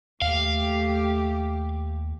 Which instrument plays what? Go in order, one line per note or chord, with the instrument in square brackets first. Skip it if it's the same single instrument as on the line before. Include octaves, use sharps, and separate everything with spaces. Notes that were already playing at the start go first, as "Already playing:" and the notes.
[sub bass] D#2 [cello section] A3 G4 [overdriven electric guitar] F5